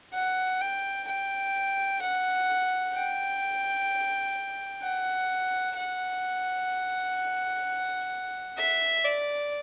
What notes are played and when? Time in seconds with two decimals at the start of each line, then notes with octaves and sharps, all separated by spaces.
0.14 F#5
0.61 G5
1.07 G5
2.02 F#5
2.95 G5
4.82 F#5
5.76 F#5
8.58 E5
9.05 D5